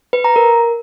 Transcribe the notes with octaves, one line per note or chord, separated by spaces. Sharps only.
B4
A#5
A#4